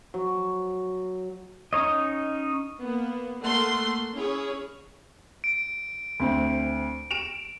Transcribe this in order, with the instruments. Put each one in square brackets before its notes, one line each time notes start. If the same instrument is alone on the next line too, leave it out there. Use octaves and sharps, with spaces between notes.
[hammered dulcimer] F#3
[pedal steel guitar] C#4 D#4 C#5 D#5
[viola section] A#3 B3
A3 A#3 F#5 C6
C#4 E4 G#4 C#5
[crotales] D7
[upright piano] D2 C4
D7 E7 F7